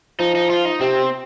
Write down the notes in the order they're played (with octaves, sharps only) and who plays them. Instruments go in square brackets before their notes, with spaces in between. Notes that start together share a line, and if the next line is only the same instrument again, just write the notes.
[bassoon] F3 [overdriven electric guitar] D#4
[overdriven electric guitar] D#4
F4
D#4
[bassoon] C3 [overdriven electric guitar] C4